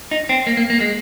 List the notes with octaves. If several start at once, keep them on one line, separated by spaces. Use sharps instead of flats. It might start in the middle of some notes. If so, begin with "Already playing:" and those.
D#4
C4
A#3
A#3
A#3
G#3